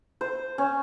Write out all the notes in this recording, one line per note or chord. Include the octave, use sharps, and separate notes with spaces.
C5
C#4